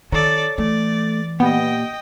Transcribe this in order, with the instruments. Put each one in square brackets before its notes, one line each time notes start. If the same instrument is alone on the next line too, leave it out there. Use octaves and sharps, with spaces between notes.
[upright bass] D#3 [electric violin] A4 D5 [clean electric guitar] C#5 A#5
[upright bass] E3 [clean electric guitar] A3 [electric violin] D5
[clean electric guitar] A#2 G4 [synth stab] B3 [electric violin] D#5 G5